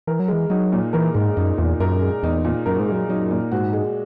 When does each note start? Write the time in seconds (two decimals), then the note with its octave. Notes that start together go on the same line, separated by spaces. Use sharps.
0.07 E3 A#4
0.19 F#3
0.28 E3 G#3
0.50 F#3 D#4
0.73 A#2
0.93 E3 A#4
1.14 G#2 G#3
1.37 F#2 D#4
1.58 E2 A#2
1.80 F#2 A#4
2.02 G#3
2.23 E2 D#4
2.45 A#2
2.66 F#2 A#4
2.79 G#2
2.88 F#2 G#3
3.09 F#2 D#4
3.31 A#2
3.52 G#2 F#4
3.73 G#3